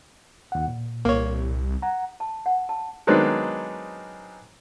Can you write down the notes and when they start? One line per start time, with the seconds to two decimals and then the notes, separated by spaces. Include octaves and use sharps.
0.52 D#2 F#5
0.68 A#2
1.05 C2 A#3 C#5
1.82 F#5 A#5
2.20 A5
2.46 F#5
2.69 A5
3.07 D#3 F#3 G#3 B3 C4 D4